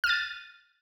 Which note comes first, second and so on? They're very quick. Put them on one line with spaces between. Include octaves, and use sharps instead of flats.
F6 D#7 A6